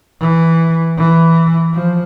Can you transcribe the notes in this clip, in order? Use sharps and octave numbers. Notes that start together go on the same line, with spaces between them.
E3
E3
F3